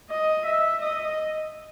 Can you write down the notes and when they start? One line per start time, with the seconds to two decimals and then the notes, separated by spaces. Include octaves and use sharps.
0.10 D#5
0.45 E5
0.81 D#5